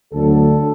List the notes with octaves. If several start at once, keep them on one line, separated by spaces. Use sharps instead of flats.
D2 D3 F#3 A4